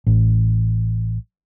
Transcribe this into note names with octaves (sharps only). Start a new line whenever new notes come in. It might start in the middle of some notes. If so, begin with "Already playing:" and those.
A1